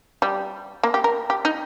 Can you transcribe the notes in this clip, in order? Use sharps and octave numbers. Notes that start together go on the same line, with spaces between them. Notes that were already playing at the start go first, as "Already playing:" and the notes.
G3
A#3
G4
A#4
G4
D#4